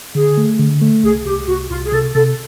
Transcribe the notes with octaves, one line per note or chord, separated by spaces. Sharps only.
D3 G#4
A3
D3
A3
C2 G#4
C2 G4
C2 F#4
C2 F4
G#4
C3 A4
C3 A4